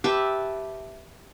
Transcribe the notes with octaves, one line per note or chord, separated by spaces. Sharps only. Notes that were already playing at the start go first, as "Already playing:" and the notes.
G4 B4 E5 A5